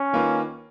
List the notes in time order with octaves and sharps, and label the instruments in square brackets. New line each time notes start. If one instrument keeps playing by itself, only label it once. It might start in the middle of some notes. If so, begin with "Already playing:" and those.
Already playing: [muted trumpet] C#4
[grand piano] D#3 A#3 F4 B4